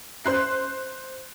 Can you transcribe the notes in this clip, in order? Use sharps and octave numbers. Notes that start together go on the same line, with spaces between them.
C5 C6 F#6 C7